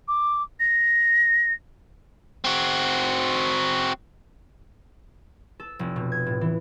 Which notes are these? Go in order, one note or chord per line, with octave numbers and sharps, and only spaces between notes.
D6
A#6
C4 F#4
A4
F1
B2
G#6
A2
E3